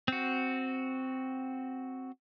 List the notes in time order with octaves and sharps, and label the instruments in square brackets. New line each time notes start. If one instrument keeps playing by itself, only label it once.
[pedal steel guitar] C4 F#4